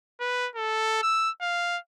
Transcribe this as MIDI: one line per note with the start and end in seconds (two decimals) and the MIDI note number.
0.20 0.48 71
0.56 1.02 69
1.03 1.30 88
1.41 1.78 77